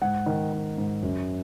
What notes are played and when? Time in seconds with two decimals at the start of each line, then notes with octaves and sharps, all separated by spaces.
0.02 G#2 F#5
0.26 D#3
0.53 D#3
0.78 G#2
1.03 F#2